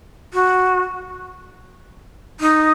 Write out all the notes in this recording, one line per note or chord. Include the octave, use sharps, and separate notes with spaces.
F#4
D#4